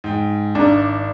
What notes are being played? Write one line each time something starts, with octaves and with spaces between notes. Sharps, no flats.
G#2 G5
G#1 D4 A#5